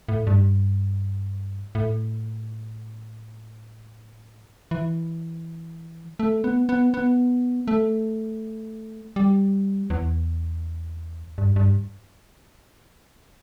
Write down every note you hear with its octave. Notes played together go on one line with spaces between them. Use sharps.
A2
G2
A2
E3
A3
B3
B3
B3
A3
G3
E2
G2
G2